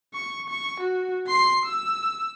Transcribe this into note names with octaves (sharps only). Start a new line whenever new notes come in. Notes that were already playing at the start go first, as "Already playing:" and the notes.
C#6
C#6
F#4
C6 C7
E6